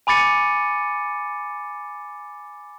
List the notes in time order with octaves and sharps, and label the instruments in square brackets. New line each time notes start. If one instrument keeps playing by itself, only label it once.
[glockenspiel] G#5 B5 D6 A6 C#7 D#7